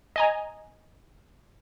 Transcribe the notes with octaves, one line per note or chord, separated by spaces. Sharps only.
D#5 G#5 A#5